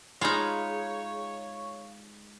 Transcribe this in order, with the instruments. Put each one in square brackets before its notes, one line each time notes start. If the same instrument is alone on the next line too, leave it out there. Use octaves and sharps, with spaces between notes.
[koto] G#3 D#4 [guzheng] F4 G#4 [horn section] C#5 [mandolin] F5 B5